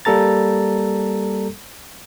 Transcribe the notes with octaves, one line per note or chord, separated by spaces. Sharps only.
G3 A#3 A4 A#5 A6